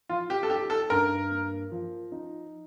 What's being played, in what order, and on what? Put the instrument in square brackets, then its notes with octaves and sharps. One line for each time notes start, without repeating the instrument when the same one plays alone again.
[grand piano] F3 [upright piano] F4
[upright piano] G4
A4
[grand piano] D#4 [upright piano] G4
[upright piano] A4
[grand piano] G2 [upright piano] A#4
[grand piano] A#3
F3
D#4